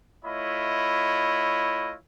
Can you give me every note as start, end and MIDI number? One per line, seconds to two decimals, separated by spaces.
0.25 1.95 57
0.25 1.95 64
0.25 1.95 65
0.25 1.95 73
0.25 1.95 75
0.25 1.95 83